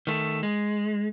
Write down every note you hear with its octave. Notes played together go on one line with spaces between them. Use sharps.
D#3 A3
G#3